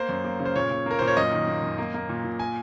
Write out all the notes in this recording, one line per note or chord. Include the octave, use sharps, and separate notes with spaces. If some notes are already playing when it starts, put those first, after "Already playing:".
Already playing: A#3 C5
F#2
A#3
C#3
C5
A#2 C#5
A#2
A#3 A#4
A#2 C5
C#5
F#2 D#5
D#3
A#3
F#2
A#3
A#3
A#2
A#2
G#5